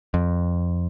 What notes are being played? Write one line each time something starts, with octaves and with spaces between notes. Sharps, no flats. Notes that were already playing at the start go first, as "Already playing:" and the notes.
F2